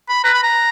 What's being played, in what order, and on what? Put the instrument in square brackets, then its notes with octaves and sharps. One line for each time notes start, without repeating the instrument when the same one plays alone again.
[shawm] B5
[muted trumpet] B4 [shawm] A#5
[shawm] B5
A#5